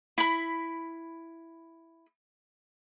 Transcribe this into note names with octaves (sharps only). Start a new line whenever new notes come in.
E4 B5